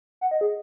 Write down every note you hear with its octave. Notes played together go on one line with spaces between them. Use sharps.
F#5
D#5
G#4